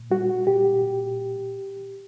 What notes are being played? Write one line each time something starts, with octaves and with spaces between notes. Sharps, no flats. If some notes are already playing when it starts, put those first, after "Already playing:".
Already playing: A#2
G3 F#4
A#2 G4
A#2